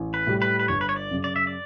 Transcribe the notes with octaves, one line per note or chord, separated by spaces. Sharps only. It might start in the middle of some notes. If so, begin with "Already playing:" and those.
Already playing: A1
B4
A2 G3
B4
B4
G1 C#5
B4
C#5
D5
F#2 C#3
D5
E5
D5